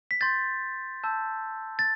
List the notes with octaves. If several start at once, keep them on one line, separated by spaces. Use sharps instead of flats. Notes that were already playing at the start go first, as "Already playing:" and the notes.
B6
C6 G6 A6
A5 E6 G6
A6